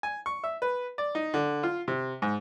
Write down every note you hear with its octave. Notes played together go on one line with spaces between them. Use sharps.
G#5
C#6
E5
B4
D5
D#4
D3
F4
C3
G#2